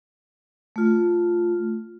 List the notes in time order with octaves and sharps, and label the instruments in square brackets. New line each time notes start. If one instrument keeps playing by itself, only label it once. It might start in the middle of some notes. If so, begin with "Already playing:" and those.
[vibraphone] A3 F4